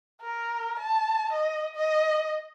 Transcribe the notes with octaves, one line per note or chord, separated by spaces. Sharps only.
A#4
A5
D#5
D#5